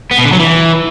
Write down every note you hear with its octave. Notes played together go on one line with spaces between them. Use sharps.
B3
B2
D3
F#3
E3